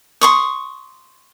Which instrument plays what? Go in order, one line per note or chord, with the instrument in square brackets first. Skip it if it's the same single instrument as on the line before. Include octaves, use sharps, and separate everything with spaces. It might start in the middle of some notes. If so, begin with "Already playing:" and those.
[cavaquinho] C6 C#6 D#6